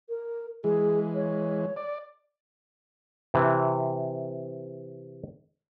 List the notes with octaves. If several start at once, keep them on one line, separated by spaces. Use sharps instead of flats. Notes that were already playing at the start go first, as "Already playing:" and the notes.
A#4
E3 G#3 G#4
C#5
D5
C3 E3